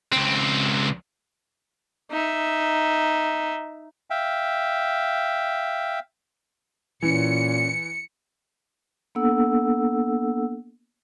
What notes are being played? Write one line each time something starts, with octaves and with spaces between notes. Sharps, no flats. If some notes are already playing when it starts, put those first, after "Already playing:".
C#2 C4
D#4 E5
E5 F5 G5
A#2 E3 C#4 C#7
A#3 B3 D4 A4 F#5 E6